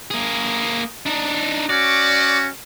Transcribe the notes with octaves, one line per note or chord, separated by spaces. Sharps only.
A#3 G#4
D4 D#4
C#4 F#4 D5